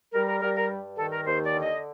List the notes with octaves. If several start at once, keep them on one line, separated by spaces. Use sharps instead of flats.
G3 A#4
A#4
G3 A#4
A#4
G2
D#3 A4
A#4
D#2 C5
D5
D3
D#5